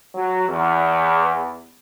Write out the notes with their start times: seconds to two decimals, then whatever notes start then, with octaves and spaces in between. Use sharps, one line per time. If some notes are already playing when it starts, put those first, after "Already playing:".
0.14 F#3
0.47 E2